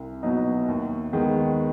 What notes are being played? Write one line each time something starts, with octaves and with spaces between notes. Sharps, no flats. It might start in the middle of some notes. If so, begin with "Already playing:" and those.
Already playing: C2
B2 F#3 B3 D#4
D#2
D#3 G#3 B3